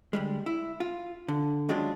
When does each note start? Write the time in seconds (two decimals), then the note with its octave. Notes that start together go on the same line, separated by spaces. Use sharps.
0.13 D2 G3 G#3
0.46 E4
0.80 F4
1.28 D3
1.69 D#2 F#3 G#3 C#4 D4 F4